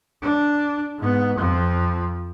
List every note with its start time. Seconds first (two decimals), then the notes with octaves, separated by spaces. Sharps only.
0.22 D4
0.98 G#2 B3
1.38 F2 F3